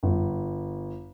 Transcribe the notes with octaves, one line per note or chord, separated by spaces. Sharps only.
G1